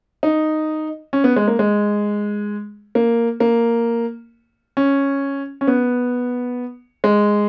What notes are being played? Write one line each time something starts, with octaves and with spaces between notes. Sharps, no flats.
D#4
C#4
B3
G#3
A#3
G#3
A#3
A#3
C#4
C#4
B3
G#3